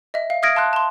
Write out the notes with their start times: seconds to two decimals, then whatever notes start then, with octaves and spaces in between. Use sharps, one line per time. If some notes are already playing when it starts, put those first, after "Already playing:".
0.14 D#5 E5
0.30 F5
0.43 E5 D#6 F6 G#6 A#6 D7
0.56 F5 A5 C6 F#6
0.73 A5 C6